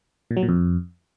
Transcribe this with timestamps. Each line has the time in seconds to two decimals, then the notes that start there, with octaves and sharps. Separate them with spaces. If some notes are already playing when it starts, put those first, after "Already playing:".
0.31 A#2
0.37 F#3
0.43 A#2
0.48 F2